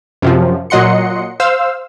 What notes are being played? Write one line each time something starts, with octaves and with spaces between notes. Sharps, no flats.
F#2 C3 F3
A#2 F#3 D#5 F#5 C6 C#7
C5 F5 E6